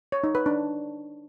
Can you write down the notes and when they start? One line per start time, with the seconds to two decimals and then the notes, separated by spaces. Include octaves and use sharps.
0.12 C#5
0.24 D#4
0.35 B4
0.46 D4